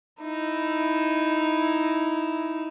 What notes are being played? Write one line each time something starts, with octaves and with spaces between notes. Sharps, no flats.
D#4 E4